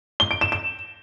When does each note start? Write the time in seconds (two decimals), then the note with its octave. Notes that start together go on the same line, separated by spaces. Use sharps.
0.20 G7
0.31 D7
0.41 E7
0.52 E7